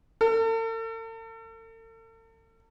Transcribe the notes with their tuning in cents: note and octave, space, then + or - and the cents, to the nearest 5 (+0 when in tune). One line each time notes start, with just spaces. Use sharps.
A4 +45